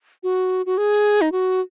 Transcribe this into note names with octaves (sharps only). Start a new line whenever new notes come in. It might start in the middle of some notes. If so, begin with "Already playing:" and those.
F#4
F#4
G#4
D#4
F#4